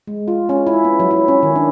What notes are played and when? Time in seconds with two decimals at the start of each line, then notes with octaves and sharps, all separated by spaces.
0.07 G#3
0.28 F4
0.49 C#4
0.67 E4
0.84 B3
1.00 F#3
1.11 E4
1.28 C#4
1.43 D#3
1.56 D4